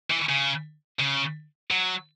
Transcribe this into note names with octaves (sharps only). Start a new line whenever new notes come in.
E3
C#3
C#3
F#3